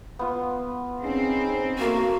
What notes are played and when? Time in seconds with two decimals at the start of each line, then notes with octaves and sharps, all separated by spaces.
0.19 B3 F4
1.03 C4 C#4 D#4 G#4
1.79 A3 A#3 F#4 C6